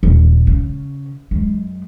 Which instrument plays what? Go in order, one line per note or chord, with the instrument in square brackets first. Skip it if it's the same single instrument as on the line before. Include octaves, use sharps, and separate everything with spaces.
[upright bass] D#1
C#3
F#2 G#3